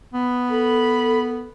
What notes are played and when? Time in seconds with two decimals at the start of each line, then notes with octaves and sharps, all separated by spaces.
0.14 B3
0.50 A4 B5